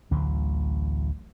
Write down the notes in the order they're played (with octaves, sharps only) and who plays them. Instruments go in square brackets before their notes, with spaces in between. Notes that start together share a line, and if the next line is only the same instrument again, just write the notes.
[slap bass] A1 D2 D3 F#3